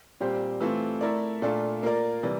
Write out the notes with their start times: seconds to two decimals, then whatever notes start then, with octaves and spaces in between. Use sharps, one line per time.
0.20 A#2 G3 C4 G4 C5
0.61 E3 A3 C4 F4
1.01 A3 E4 A#4 D5
1.42 A#2 A3 D4 F4 A4
1.83 A#3 F4 A#4 D5
2.23 C3 E3 G3